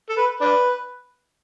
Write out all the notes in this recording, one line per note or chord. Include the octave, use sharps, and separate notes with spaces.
A4
B4
D4 B4